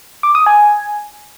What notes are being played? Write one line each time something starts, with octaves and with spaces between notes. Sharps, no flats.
D6
D#6
G#5